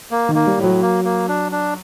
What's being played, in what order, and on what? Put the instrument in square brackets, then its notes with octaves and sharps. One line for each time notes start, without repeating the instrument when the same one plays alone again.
[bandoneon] A#3
[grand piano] D#3
[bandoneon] A#3
[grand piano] G3
[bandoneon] A2
[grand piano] F#3
[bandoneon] A#3
A#3
D4
D4